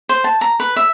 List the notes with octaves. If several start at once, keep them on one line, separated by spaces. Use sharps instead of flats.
C5
A5
A#5
B4
E5